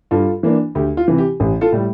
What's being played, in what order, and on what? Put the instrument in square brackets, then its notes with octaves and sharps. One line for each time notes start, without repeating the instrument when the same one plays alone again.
[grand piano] G2 F4 A4
E3 A#3 D4
D2 G4
F4
C3 E3
G4
A1 G4
F4 A4
A2 G3